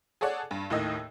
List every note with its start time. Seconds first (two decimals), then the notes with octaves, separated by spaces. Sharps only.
0.21 G#4 A4 C#5 D5 F#5
0.51 G2
0.70 D#2 A2 D#3 D#5 E6